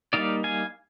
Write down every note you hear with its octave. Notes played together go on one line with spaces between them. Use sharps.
G3 A#3 D#4 D5 F5
F5 G#5